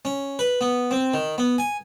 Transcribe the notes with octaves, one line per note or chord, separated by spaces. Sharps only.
C#4
B4
B3
C4
D#3
B3
G#5